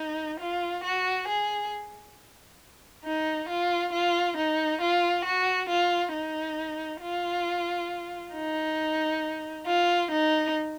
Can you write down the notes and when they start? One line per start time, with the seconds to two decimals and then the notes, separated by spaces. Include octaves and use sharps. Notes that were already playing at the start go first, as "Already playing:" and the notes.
Already playing: D#4
0.40 F4
0.84 F#4
1.28 G#4
3.04 D#4
3.49 F4
3.93 F4
4.37 D#4
4.81 F4
5.25 F#4
5.69 F4
6.13 D#4
7.02 F4
8.34 D#4
9.67 F4
10.11 D#4